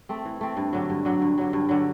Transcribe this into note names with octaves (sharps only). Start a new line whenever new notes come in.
A3 C4
E3
A3 C4
G2
D3 F#3
G2
D3 F#3
G2
D3 F#3
G2
D3 F#3